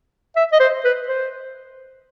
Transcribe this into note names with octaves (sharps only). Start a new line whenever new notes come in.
E5
D#5
C5
B4
C5